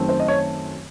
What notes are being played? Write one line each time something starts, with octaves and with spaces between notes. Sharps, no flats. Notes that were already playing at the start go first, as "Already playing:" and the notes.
Already playing: F#2 D#3 A3 C4
C5
D#5
C#5